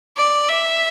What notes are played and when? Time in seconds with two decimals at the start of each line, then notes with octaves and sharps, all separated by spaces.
0.17 D5
0.48 E5